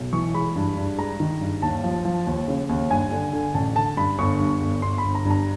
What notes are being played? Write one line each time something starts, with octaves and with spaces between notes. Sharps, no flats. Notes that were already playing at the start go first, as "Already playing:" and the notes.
Already playing: B1
E3 C#6
G#3 B5
G2
G2
G#3 A#5
D#3
G2
D#2 A5
F3
F3
D#2
C#3
D#2
G2 G#5
D3
D3
A1 A5
D3 A5
G2 B5
G1 C#6
G2
G1
G1 C6
B5
G1
A#5
G2
A#5